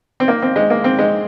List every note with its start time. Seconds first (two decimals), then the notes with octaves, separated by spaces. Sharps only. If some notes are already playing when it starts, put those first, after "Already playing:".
0.20 C4
0.28 A#3
0.42 C4
0.56 G#3
0.70 A#3
0.84 C4
0.99 G#3